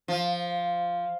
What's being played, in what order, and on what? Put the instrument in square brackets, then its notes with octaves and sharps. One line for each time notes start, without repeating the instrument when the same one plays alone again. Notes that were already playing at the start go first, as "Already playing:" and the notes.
[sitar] F3